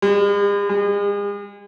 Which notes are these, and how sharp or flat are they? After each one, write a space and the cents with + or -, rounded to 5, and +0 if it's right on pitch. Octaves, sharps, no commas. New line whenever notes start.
G#3 -45
G#3 -40